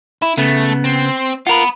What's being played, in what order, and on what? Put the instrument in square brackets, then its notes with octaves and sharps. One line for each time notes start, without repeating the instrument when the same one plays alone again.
[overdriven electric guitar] E4
[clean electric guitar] C#3 B3 [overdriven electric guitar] A3
[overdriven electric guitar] C4
[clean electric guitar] F4 A#4 [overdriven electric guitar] F#5 B5